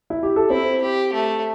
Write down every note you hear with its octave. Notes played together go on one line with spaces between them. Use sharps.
E4
G4
A4
C4 E4 C5
G4
A3